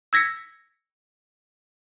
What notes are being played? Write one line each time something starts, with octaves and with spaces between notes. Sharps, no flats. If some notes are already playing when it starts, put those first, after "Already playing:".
E6 G#6 A#6 B6 C#7